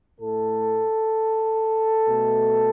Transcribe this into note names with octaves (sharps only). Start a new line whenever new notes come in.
A2 A3 A4
B2 A3